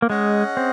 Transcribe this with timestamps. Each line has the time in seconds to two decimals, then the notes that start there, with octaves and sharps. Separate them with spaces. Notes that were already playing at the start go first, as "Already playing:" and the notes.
0.02 A#3
0.10 G#3 C#4 G#4 D#5 F#5
0.57 C4